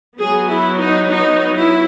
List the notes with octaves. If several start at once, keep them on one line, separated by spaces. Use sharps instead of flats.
F#3 B3 G#4
E4
D#4
D#4
E4